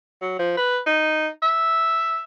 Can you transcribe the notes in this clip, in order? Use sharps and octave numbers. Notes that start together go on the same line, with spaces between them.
F#3
F3
B4
D#4
E5